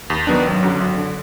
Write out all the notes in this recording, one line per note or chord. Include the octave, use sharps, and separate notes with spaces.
D#2
D#3 F#3 B3 D4
G#1 F#3
F#2 D3
G#1
D3